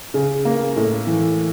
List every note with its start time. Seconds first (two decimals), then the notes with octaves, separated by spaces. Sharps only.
0.14 C#3
0.45 A#3
0.76 A2
1.07 E3